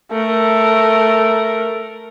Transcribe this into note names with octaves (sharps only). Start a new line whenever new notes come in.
A3 A#4